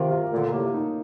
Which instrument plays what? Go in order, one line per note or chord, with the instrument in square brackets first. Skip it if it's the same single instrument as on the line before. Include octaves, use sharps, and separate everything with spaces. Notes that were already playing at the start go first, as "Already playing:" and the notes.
Already playing: [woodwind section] C3 D#3 [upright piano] F4 A#4
[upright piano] F4
[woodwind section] A#2 D3 [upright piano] A#3
[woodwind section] A2 C3 [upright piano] A#3
[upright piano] D#4